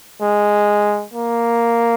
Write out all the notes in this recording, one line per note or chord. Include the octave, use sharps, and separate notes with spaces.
G#3
A#3